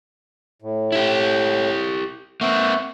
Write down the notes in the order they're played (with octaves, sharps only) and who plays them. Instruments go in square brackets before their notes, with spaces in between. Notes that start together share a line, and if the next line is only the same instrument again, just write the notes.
[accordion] A2
[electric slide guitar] E4 G4
[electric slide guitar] A#3 C4 [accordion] E5 F#5 C#6